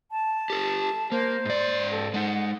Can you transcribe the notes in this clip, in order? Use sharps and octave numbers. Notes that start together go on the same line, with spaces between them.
A5
G4 A4
A#3 C5
G#2 D5
A4
G#3 D#4 F#5